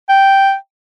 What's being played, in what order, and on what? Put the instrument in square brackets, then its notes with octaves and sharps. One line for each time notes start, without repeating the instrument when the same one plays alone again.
[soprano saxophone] G5